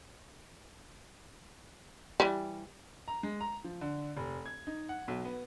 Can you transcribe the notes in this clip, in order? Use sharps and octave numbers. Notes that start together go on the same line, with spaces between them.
E3 G3
A#5
G#3
A#5
F3
D3
F1
G#6
D#4
F#5
B1
B3